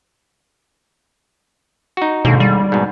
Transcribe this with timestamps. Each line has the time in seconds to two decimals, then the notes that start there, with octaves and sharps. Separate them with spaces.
1.97 D#4 F#4
2.25 D#2 G#2 B2 D3
2.40 G3
2.72 G#2 B2